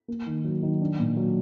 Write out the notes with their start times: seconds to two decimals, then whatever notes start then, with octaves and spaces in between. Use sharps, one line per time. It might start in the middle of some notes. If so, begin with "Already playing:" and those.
0.08 A#3
0.26 D#3
0.44 F#3
0.62 D#3
0.81 D4
0.99 A#2
1.17 F#3